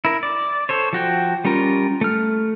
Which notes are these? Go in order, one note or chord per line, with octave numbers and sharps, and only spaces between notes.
E4 A#4
D5
A4 C5 C#5
F3 F#4 G5
G3 C#4 F4 A#4
A3 F6